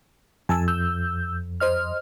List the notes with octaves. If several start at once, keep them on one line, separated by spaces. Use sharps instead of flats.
F2 G#5 A5 E6
E6 G6
C5 D#5 F6